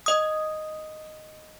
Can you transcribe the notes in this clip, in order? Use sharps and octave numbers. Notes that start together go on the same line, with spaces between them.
D#5 D#6